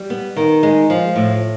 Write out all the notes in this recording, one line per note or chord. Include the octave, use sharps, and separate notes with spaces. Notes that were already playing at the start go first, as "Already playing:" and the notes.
Already playing: G3
B3
D#3
G#3
F3
A2